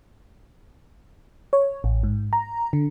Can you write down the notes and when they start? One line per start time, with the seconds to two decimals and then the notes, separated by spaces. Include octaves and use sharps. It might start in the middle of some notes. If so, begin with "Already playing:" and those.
1.53 C#5
1.84 A1
2.03 G#2
2.33 A#5
2.73 D3